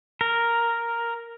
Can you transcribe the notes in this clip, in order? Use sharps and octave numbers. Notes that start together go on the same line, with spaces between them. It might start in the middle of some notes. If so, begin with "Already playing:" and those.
A#4